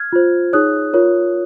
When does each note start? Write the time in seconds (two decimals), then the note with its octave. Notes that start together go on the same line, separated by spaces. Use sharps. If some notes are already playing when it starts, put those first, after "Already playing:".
Already playing: F6 G#6
0.13 F4 C5
0.53 D#4 G#4 C#5 D#6 F#6
0.93 F4 A#4 C#5